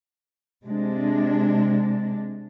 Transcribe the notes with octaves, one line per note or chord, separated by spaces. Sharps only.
C3 G#3 D4